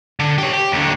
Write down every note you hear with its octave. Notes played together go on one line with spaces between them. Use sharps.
D3
G4 C#5
G4
D#2 D3